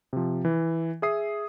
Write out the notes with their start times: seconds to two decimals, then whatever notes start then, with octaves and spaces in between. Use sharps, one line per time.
0.13 C3 F3
0.45 E3
1.02 G#4 E5 D#6 C7